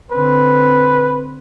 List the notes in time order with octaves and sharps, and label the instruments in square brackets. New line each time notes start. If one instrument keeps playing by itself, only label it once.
[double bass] D3 C4 [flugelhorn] B4